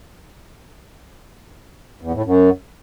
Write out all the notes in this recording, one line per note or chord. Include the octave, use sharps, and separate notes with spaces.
E2
A2
F#2